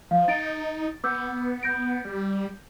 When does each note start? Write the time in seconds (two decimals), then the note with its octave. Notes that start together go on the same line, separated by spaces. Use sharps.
0.11 F3 F5
0.28 D#4 A6 D7
1.04 B3 D6 E6 G6
1.63 G6 A#6 D7
2.05 G3